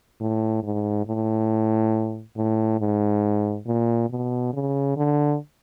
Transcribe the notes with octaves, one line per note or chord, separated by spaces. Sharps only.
A2
G#2
A2
A2
G#2
A#2
B2
C#3
D3